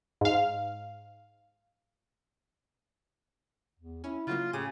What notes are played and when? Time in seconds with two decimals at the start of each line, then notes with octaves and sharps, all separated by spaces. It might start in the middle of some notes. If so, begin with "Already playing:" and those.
0.21 G#2 F5
3.79 E2
4.04 C#4 E4
4.27 C#3 F#3 A#3 F4
4.53 A2 C#3 G4 D6 D#7